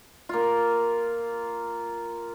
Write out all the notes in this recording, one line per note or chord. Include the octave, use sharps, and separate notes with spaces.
A#3 F4